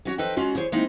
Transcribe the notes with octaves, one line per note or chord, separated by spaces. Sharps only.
C#4 F#4 C#5
F3 D#4 A4 B4 D#5 G5
G#3 C#4 F4 F#4
E4 G#4 C5 C#5
G#3 A#3 C4 D#4 E4